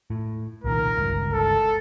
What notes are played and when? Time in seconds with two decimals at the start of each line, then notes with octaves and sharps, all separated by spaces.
0.10 A2
0.64 C2 A#2 D#3 A#4
0.97 G1 C#2 G2
1.33 A4